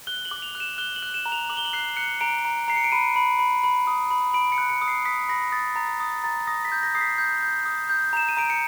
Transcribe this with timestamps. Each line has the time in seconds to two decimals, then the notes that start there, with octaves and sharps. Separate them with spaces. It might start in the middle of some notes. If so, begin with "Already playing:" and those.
0.07 F#6 G7
0.25 F#7
0.31 D6
0.42 F7
0.55 F#6
0.60 E7
0.78 F#6 G7
0.96 F#7
1.03 F#6
1.14 E7
1.26 A#5
1.32 F7
1.50 D6 F#7
1.57 G7
1.65 F#7
1.73 F#6 C7
1.97 F#6 C#7
2.21 A#5 D7
2.45 A#5
2.68 A#5 C7
2.76 C#7
2.84 D7
2.92 B5 D#7
3.16 B5
3.39 B5
3.63 B5
3.87 D#6
4.10 B5
4.34 B5 D7
4.52 C#7
4.58 F#6
4.70 C#7
4.81 D#6
4.88 C7
5.05 D#6 B6
5.29 B5 A#6
5.52 D#6 A6
5.76 A#5 A6
6.00 D#6 A6
6.24 A#5 A6
6.47 D#6 A#6
6.65 B6
6.72 G6
6.83 A#6
6.95 D#6 C7
7.01 B6
7.18 G6
7.42 G6
7.65 D#6
7.90 G6
8.13 A#5 E7
8.29 D#7
8.37 A#5 D7
8.50 C#7